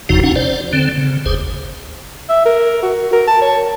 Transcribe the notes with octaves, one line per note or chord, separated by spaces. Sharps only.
F#1 E2 C3 F3 D#4 F#4
C#4 D#4 F#5
C5 D5
D3 C4
C#3
G1 D2 G#4 C5
E5
A#4
F#4
A#4
A5
C#5